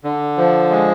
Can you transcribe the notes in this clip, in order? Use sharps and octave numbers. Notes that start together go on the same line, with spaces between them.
D3
F3
G#3